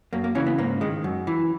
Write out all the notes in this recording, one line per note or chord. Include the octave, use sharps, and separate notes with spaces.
F#2 A#3
A#3
C#3 E3 C#4
B3
G#2 A#3
D#3 G#3
F#2
E3